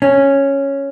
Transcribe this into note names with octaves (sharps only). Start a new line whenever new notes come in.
C#4